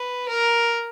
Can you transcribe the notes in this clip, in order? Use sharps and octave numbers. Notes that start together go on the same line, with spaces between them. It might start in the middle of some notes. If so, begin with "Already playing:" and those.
Already playing: B4
A#4